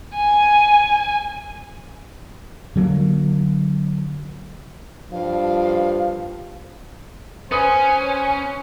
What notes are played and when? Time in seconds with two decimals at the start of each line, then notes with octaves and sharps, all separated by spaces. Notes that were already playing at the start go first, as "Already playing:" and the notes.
0.16 G#5
2.76 D3 F#3 A3 A#3
5.12 G2 F3 F5
7.52 C#4 B4 C5 G#5 D#6